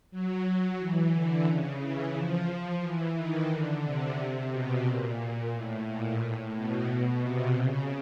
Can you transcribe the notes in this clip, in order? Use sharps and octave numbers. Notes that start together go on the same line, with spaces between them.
F#3
E3
D3
C#3
E3
F3
F3
E3
D#3
D3
C3
C3
B2
A#2
A#2
A2
A#2
A2
B2
C3
C#3